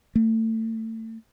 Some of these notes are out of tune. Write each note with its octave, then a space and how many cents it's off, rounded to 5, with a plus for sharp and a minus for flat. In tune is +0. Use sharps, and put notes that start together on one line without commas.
A3 +30